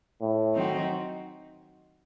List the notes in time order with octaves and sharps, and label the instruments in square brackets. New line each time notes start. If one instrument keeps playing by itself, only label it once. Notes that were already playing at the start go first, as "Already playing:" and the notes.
[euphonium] A2
[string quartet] D#3 F#3 C4 D#4 F#4